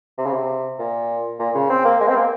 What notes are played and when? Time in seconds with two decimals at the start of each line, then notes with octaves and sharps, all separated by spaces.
0.18 C3
0.26 C#3
0.33 C3
0.79 A#2
1.39 A#2
1.55 C#3
1.69 C4
1.85 A#3
2.00 G#3
2.08 C4
2.15 A#3